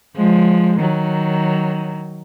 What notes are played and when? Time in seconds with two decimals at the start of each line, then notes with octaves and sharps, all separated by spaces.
0.16 F3 G#3
0.80 D#3 F#3